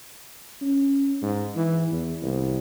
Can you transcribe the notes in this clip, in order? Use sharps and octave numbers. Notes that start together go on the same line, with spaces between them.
C#4
G#2
E3
E2
C2